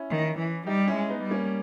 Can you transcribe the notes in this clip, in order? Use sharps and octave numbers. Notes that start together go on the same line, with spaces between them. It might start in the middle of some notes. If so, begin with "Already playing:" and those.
Already playing: C#4 E4
D#3
E3
G3 D#4 G4
C#4 E4
G#3
B3 D#4
G3
A#3 C#4